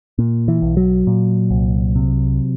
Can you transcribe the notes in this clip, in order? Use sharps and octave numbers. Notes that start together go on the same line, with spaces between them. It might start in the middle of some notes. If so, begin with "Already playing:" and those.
A#2
E3
B1
F#3
A#2
C2
C3